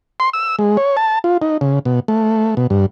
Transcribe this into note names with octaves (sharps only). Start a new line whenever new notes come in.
C6
E6
G#3
C#5
A5
F4
D#4
C#3
B2
A3
B2
G2